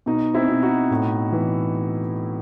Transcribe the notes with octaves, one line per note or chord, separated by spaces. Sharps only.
B2 D#4
C4 E4
B2
D#4 F#4
A2
E3